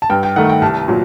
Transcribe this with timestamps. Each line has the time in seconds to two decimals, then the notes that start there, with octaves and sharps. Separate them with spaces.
0.02 A5
0.10 G2 G5
0.23 G5
0.36 D#3 A3 F#5
0.49 G5
0.61 C2 A5
0.88 A#2 F#3